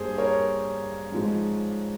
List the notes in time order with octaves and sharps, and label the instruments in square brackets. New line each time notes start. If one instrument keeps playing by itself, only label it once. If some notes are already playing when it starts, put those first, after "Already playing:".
Already playing: [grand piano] G2 G3 A#3 G#4 C5
A#4 C#5
G#2 F3 G#3